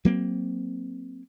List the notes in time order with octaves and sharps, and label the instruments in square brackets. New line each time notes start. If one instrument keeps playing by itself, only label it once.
[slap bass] F#3 A#3 C4